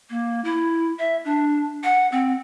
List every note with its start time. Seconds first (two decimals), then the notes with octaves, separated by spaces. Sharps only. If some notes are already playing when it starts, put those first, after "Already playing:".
0.10 A#3
0.44 E4
0.99 E5
1.25 D4
1.84 F#5
2.12 C4